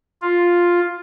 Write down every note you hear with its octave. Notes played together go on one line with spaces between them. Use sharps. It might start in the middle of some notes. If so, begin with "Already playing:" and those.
F4